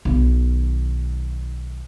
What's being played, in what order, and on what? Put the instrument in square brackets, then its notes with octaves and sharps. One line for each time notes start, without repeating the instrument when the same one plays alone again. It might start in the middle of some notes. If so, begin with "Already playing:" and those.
[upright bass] B1 D#3